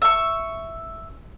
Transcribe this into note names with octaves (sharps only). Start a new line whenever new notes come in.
E5 C#6